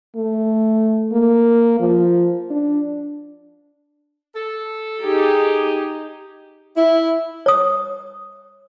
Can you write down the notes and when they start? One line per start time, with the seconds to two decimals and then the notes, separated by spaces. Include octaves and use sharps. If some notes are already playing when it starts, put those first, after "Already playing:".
0.16 A3
1.12 A#3
1.80 F3
2.50 D4
4.35 A4
5.00 D#4 G4 G#4
6.77 E4
7.46 C#5 D#6